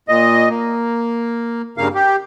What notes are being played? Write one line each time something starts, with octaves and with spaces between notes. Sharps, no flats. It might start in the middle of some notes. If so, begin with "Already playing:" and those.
A#2 D#5
A#3
G2 C#3 A#3 F5
G4